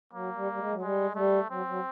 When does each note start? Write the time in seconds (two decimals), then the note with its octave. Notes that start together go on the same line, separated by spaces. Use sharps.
0.13 F#3 A#3
0.36 G3
0.52 G3
0.59 G#3
0.72 F#3
0.81 G3 G#3
1.12 G#3
1.16 G3 A3
1.50 F#3 C4
1.68 F#3